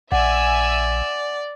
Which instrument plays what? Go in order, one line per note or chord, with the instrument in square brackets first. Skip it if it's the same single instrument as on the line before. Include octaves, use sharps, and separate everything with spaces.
[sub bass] A#1 [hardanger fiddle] D5 [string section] E5 G#5 E6 [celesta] F#5